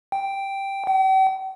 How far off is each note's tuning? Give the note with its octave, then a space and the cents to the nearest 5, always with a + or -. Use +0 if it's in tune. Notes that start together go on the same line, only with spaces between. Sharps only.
G5 +0
G5 -45